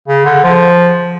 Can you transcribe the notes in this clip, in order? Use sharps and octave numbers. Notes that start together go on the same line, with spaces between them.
C#3
D3
F3